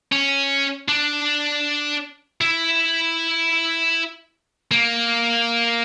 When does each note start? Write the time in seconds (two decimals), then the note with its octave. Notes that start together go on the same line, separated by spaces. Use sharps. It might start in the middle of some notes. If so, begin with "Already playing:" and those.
0.12 C#4
0.89 D4
2.41 E4
4.71 A#3